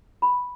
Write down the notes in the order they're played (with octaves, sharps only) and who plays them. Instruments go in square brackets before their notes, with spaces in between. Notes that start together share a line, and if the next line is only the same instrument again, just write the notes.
[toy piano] B5